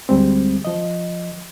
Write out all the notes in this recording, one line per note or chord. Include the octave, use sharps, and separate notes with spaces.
D2 G3 G#3 C4
F3 D#5